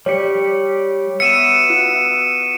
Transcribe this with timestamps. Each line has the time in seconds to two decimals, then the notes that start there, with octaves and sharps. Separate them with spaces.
0.06 G3 G4 C#5 D5 C#7
1.20 B3 F#4 E5 C#7 D#7 E7
1.70 F4